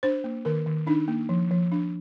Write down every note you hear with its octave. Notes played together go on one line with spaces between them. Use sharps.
D4 C5
A#3
D#3 A#4
D#3
D4 D#4
A#3
F3
F3
D4